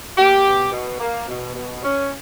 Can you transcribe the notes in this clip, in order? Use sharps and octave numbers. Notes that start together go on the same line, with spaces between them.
A#3 G4
B2
B2
A#3
B2
B2
C#4